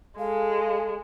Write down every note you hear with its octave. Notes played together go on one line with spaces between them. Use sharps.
G#3 A4 F5